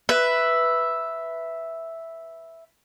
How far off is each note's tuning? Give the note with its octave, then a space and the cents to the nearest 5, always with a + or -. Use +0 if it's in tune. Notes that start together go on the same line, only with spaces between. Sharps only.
B4 +0 E5 +0